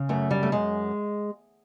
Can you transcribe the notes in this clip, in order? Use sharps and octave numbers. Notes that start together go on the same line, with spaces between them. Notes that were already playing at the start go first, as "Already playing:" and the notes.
Already playing: C#3
F#2 A3
G3
A3
F#2 G#3